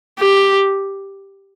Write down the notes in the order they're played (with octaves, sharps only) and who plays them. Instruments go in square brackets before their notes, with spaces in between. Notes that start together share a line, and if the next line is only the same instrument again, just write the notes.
[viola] G4